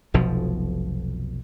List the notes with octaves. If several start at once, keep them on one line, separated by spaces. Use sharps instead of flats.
F1 B1 B2 F3